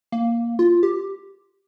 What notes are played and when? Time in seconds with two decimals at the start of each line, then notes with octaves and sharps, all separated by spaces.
0.12 A#3
0.59 F4
0.83 G4